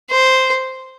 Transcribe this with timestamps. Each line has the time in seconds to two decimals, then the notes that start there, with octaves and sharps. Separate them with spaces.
0.10 C5